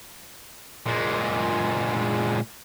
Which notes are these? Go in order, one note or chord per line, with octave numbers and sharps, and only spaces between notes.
A#2 G#3